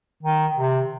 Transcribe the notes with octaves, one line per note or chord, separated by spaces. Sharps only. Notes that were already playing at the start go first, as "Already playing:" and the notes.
D#3
C3